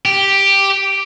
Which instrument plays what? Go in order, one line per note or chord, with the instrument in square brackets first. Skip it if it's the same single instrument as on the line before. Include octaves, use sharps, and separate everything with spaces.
[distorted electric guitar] G4